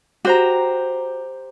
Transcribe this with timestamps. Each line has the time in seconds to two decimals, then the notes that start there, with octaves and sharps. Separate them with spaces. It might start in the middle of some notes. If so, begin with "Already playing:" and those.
0.25 F#4 G4 C5 A#5